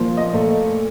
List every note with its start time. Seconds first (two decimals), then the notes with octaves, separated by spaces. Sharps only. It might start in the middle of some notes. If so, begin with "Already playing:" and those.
Already playing: A#2 F3 A#3
0.17 D#5
0.33 A#2 A3